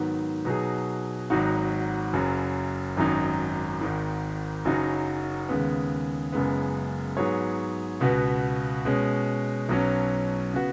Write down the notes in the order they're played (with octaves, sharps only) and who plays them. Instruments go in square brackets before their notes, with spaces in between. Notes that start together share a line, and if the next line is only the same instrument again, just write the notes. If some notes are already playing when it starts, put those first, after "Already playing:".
Already playing: [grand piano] G#2 D#3 F#3 B3
B2 F#3 D#4 G#4
G#1 G#2 F#3 D#4 F#4
F#1 F#2 F#3
G#1 F#2 F#3 D#4
G#1 G#2 D#3
F#1 F#2 F#3 D#4 F#4
D#2 C#3 G#3 B3
F#1 F#2 C#3 G#3 B3
G#2 F#3 B3 G#4 C#5
C#2 B2 B3 F#4
B2 G#3 C#4
B1 B2 F#3 C#4
C#3 B3 F#4